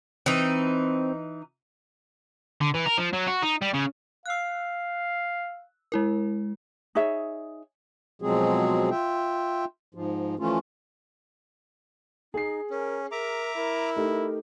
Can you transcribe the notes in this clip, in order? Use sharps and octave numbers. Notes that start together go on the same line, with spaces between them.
E3 C4 D#4
D3
E3
A#4
F3
F#3
F#4
D#4
G3
C#3
F5 E6 F#6
G#3 E4 A#4
D#4 G#4 C#5 E5
B2 F3 F#3 G#3 C4 G#4
F4 E5 G5
G#2 F3
E3 F3 A3 C#4 F4
D#4 G#4 C7
C#4 A#4
A#4 E5 A#5 D6
E4 A#4
A3 D#4 G4